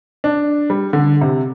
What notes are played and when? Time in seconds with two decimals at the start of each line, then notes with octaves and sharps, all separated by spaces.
0.24 D4
0.70 G3
0.93 D3
1.21 C3